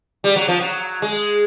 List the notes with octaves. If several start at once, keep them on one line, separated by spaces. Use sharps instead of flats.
G3
F#3
F3
F#3
G#3